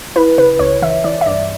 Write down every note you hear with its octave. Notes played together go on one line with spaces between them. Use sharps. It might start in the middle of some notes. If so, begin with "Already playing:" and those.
E4 B4
C#3 B4
C#2 C#5
E3 E5
E3 D5
E5
G2 D5